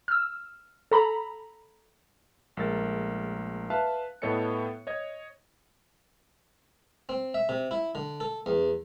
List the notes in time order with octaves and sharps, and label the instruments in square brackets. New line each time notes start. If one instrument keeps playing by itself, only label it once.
[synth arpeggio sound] E6 F6
A4 A#5 B5
[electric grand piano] A#1 G#3 A3 A#4 E6 A6
B4 E5 F5 A5 F#6
A2 B3 A4 C#5 D#5 C#7
C#5 D#5 G#6
[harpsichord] C4
E5
C3
E4
D3
A4
E2